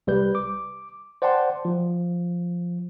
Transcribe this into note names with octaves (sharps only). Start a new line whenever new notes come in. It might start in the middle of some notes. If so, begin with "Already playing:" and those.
C2 G3 B4 G6
D6
C5 D5 F#5 G5 A5 C6
F3